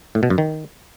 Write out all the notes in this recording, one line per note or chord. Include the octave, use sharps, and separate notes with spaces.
A2
B2
F#2
D#3